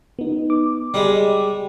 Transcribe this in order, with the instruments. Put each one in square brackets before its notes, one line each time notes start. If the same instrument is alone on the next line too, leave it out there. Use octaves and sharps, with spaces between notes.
[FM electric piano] B3 D#4
D6
[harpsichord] G3 G#3